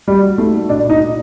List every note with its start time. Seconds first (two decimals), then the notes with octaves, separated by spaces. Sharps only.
0.08 G3 F#4
0.23 F#4
0.38 A3 D#4
0.54 F#4
0.69 A#2 D4
0.85 A#2 D#4
1.00 A#2